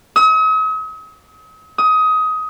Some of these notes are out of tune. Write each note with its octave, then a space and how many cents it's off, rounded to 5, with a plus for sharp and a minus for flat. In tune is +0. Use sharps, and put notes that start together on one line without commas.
D#6 +45
D#6 +20